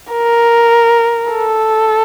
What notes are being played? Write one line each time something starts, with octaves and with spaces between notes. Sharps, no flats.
A#4
A4